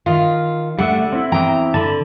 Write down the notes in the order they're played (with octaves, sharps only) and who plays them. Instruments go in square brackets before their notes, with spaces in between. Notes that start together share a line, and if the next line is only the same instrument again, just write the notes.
[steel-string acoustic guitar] D#3 [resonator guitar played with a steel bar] F4
[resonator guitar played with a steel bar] D3 [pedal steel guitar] G3 A3 E5 [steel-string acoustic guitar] F#5
[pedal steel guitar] C4 E4
[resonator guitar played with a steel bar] E2 G5 [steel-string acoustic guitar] A#5
[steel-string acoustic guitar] D3 [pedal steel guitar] A5 B5